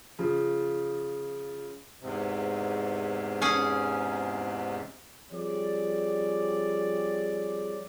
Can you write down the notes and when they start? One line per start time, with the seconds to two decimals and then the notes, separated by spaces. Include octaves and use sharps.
0.19 C#3 F3
2.02 E2 G#2 C3
3.42 C#4 G#4 G#5
5.31 F3 G3 C4 G#4 C#5 D5